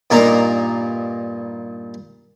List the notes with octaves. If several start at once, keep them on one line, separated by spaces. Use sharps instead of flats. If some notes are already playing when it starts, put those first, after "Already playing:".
G2 A#2 A#3 D#4 A#5